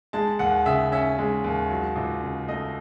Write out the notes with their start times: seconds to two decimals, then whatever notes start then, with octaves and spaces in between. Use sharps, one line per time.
0.13 G#3 A5
0.39 D#2 F#5
0.66 C#3 E5
0.92 C#4 E5
1.19 G#3
1.44 D#2
1.70 F#3
1.96 C#2
2.22 C#3
2.48 A3 D#5